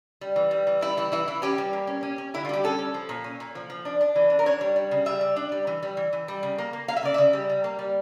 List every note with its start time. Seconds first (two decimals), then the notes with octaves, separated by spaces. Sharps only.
0.21 G3
0.36 E3
0.51 G3
0.67 E3
0.81 G3 E4
0.97 E3 E4
1.12 E3 E4
1.28 E3 E4
1.42 C#4 G4
1.58 G3
1.73 A#3
1.87 C#4
2.03 C#4
2.18 C#4
2.34 D3 E4
2.45 F4
2.49 G3 G4
2.64 C#4 A4
2.79 C#4
2.94 F3
3.09 A#2
3.24 C#4
3.40 A#2
3.55 F3
3.70 F3
3.85 D4
4.01 D4
4.16 E3
4.30 D4
4.39 A#4
4.46 D4 C#5
4.61 G3
4.76 G3
4.91 C#3
5.06 G3 E5
5.21 G3
5.36 D4
5.52 G3
5.67 E3
5.82 G3
5.97 E3
6.13 E3
6.28 G3
6.43 C#3
6.58 A#3
6.73 A#3
6.88 A#3 F5
6.96 E5
7.03 C#3 D5
7.14 C#3 E5
7.33 G3
7.50 G3
7.64 A#3
7.79 G3